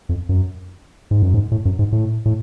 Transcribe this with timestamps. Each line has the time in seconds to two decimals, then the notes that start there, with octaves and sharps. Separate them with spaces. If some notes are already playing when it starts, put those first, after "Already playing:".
0.09 F2
0.29 F#2
1.11 G#2
1.23 F#2
1.34 G#2
1.52 A2
1.65 F#2
1.79 G#2
1.92 A2
2.25 A2